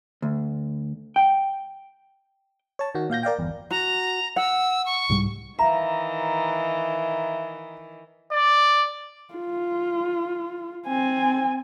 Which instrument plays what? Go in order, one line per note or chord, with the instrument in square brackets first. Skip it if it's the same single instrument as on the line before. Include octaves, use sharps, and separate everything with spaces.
[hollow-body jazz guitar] D2
G5
[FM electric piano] C#5 A5
D#3 F#4
A#2 F5 G6 A#6
A#4 D5 F5 G5
G1 E2
[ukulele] F#4 [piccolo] A#5
[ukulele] F#5 [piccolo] E6
[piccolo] C#6
[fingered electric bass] C2 G#2 G3
[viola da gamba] D#3 E3 [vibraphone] E5 F5 [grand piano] A#5
[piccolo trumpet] D5
[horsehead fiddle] F4
C4 G#5